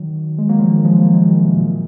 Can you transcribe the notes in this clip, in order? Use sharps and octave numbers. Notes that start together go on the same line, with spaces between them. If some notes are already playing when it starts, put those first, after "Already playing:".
Already playing: D#3 F#3
G#3
F#3 A#3
F3 G#3
D#3 F#3
F3 G#3
F#3 A#3
F3 G#3
D#3 F#3
C3
A#2
A#2